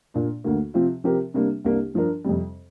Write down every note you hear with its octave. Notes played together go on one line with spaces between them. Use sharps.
A#2 A#3 D4
D2 D3 A#3
C3 F3 C4 F4
C3 F3 C4 G4 A#4
C3 G3 A#3 D4
C2 C3 A#3 D4
G2 F3 D4 A#4
F2 C3 G3